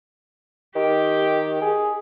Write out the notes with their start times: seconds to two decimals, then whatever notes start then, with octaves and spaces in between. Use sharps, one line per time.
0.76 D#3 G4
1.62 G#4